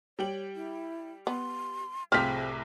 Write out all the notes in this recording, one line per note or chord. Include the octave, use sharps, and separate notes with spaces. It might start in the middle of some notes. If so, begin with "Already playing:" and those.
G3 C#5 G5 F#7
E4
B3 C6
C2 A2 C3 F3 C4 G#4 F6 B6